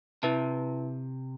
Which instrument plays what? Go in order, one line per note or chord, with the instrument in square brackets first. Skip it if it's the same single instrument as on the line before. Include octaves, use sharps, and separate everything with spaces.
[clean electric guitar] C3 [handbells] E4 B4 E5 A5